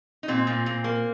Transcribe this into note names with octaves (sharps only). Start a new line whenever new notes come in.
D#4
A#2 C4
A#2
A#2
A#3